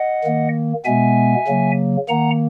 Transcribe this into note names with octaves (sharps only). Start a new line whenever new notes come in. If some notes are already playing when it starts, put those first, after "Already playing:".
Already playing: D#5 F#5
D#3 A#3
B2 G#3 B3 E5 G#5
C#3 F#3 A#3
D#3 A#3 F#5 A#5